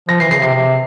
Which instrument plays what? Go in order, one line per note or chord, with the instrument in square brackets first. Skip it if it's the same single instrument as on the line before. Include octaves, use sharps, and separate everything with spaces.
[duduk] F3 [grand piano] A#6
[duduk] E3 [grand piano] C7
[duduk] C#3 [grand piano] C7
[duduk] C3 [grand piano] C7
[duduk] C3